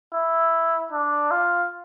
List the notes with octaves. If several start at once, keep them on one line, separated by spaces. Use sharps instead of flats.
E4
D4
F4